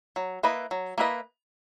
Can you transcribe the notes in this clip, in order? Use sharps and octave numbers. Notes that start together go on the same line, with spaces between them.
F#3
A#3 E4 B4 D#5
F#3
A#3 E4 B4 D#5